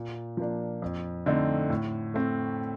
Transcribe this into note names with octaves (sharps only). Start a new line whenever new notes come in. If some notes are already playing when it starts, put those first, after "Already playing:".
Already playing: A#2
F3 A#3 D4
F2
D3 A3 C4 D#4
A2
A3 C4